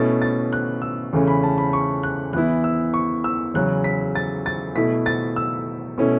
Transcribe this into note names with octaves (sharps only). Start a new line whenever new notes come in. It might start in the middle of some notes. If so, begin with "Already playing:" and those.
Already playing: B2 A3 C#4 E4 A6
A6
F#6
E6
E2 C#3 A3 C#4
B5
A5
B5
C#6
F#6
E2 E3 B3 E4 F#6
E6
C#6
E6
E2 C#3 F#3 C#4 F#6
B6
A6
A6
B2 A3 E4 B6
A6
E6
B2 A3 C#4 E4